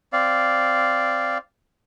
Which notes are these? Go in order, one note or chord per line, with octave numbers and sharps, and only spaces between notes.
C4 D5 F5